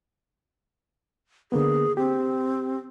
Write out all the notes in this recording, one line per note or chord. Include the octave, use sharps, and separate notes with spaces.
D3 A#3 B3 G#4
C4 G4